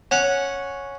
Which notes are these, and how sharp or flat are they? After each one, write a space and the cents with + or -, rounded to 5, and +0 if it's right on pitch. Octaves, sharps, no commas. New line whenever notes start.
C#4 +0 F#5 -10